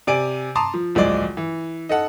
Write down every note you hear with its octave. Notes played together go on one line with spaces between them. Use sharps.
C3 D5 G#5 D7
A5 A#5 C6 D6 D#6
F3
D1 A#1 G#3 D5 D6
E3
D#4 A4 F#5